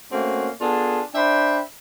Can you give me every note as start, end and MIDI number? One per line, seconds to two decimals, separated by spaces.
0.12 0.49 57
0.12 0.49 58
0.12 0.49 60
0.12 0.49 61
0.12 0.49 66
0.61 1.03 59
0.61 1.03 62
0.61 1.03 65
0.61 1.03 68
0.61 1.03 69
1.15 1.60 62
1.15 1.60 72
1.15 1.60 76
1.15 1.60 79
1.15 1.60 83